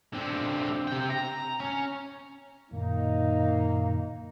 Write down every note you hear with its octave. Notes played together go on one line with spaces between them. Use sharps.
D3 C4
C3 G5
A#5
C#4
F#2 A#2 D#3 A#3 D#4